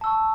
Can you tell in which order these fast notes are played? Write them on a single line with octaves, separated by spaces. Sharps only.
A5 E6 C#6